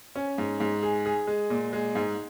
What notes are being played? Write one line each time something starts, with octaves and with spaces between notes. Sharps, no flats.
C#4
G#2
G#2
G#4
G#4
G#3
A#2
G#3
G#2